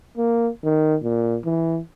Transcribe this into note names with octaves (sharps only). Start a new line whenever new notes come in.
A#3
D#3
A#2
E3